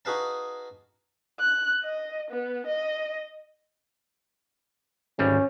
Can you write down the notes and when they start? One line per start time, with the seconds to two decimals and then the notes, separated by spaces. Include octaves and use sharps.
0.05 D#4 F#4 G#4 B4 F5 A5
1.40 F#6
1.84 D#5
2.31 B3
2.67 D#5
5.19 G#1 D2 G3 C#4